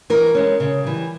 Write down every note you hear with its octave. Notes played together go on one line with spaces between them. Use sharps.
E3 A#4
G#3 C#4
C#3
E3 G3